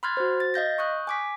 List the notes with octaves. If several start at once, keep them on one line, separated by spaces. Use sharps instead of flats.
B5 C6 F6 F#6 G#6 A6
F#4 C5
A6
D#5 F5 G6 A#6
C#6 D#6 F#6 G6
G#5 D6 B6